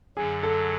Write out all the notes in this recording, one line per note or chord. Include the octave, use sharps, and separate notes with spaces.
F#2 D3 F#3 G#4
A4